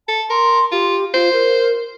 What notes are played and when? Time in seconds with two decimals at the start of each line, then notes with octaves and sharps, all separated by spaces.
0.08 A4 A5
0.30 A#4 C6
0.72 F4 G4
1.14 F4 C5
1.33 A#4